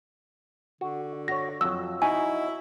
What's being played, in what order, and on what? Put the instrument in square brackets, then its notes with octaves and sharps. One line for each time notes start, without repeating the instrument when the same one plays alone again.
[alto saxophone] D3 [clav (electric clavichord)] F#4
[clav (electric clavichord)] F#4 C#5 [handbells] A#6
[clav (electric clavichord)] F2 F#3 [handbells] E6
[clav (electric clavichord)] D#4 F#4 [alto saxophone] E4 [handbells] G#5